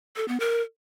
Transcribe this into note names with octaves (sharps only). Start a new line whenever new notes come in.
A4
B3
A#4